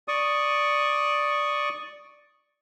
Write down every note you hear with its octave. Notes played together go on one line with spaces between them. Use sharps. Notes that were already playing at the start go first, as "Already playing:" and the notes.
D5 C#6 D#6